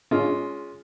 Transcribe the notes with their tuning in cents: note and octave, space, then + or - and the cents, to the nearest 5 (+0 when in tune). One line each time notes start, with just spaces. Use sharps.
G#3 +0 C#4 +20 F4 +0